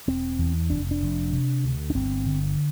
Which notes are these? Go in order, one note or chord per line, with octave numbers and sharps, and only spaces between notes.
E1 C4
E2
F1 D4
D4
F1
C3
D2
D4
G1 C4
D3